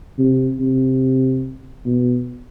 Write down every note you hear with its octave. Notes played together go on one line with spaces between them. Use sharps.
C3
C3
B2